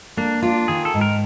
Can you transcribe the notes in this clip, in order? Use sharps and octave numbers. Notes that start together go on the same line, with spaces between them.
A#3 D4
D4 F4
D#3 G#4
A4
G#2
A#4